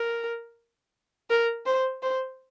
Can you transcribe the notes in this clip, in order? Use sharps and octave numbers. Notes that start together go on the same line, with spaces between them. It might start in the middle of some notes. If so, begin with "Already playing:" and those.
Already playing: A#4
A#4
C5
C5